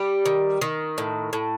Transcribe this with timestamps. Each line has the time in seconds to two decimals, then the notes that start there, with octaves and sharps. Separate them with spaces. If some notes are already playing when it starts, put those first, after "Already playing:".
Already playing: G3 G4
0.26 D#3
0.61 D#3
0.98 A2
1.33 A2